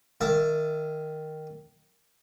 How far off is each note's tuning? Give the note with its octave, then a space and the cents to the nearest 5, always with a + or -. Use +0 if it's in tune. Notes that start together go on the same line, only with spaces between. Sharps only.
D#3 +0 E5 +25 A5 +0